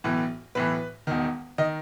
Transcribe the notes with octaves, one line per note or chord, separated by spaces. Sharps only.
B1 A2 E3
B1 A2 E3 B4
E1 E2 D#3
D#3 D#5